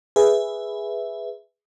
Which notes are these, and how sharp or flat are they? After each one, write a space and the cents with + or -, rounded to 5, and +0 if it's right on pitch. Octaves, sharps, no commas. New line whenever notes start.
G#4 +0 B4 +0 E5 +0